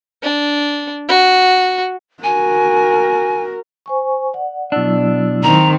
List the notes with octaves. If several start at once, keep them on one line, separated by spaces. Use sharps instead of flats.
D4
F#4
F#4 A#4 G#5
C5 G#5 C#6
D5 F#5
B2 F#3 D4 E4 E6
D#3 C4 A#5